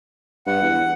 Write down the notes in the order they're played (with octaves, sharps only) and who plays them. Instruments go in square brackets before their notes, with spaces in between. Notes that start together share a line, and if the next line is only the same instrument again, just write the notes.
[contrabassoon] G2 [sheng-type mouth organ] F#5
[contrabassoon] E2